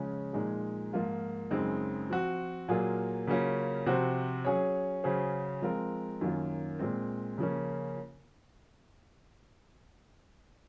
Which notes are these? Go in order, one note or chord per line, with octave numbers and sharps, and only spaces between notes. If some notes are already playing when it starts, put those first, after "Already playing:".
Already playing: C#3 F3 G#3 C#4
A#2 F3 G#3 D#4 G#4
G#2 F3 A#3 F4
F#2 C#3 G#3 C4 D#4
F3 C4 F#4
A#2 F#3 A#3 F4 G#4
C#3 F#3 A#3 C#4 F4
C3 F3 C4 F#4 C5
F#3 C#4 G#4 C#5
C#3 F#3 C#4 G#4 C5
F3 G#3 C4 F4 A#4
F#2 D#3 A#3 C#4 F4
A#2 G#3 C4
C#3 F3 A#3 C#4